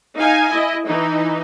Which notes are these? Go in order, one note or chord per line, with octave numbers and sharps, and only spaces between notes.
D#4 F5 G#5
E4 D#5
E3 D#4